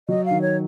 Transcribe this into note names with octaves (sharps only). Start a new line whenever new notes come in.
F#3 D#5
F5
D#3
C#5